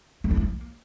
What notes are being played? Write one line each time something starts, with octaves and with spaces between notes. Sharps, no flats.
C4
E4
A#3